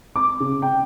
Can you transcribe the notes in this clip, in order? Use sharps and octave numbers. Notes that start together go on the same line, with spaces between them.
D6
C#3
G5